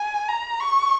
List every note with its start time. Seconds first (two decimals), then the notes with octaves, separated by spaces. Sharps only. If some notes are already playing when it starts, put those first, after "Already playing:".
Already playing: G#5
0.29 A#5
0.60 C#6